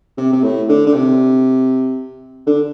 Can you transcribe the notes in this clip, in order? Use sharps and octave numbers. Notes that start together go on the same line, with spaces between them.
C3
C3
A2
D3
D3
C3
D3